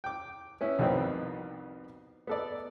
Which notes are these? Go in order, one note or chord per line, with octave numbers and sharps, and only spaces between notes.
G5 D6
B3 C#4 E4
C2 F2 B2 D#3 B3 C4
B3 A4 D5